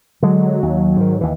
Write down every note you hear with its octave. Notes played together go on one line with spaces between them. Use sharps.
D3 F#3 G#3
D#2
G#2 D#3
D#2 E3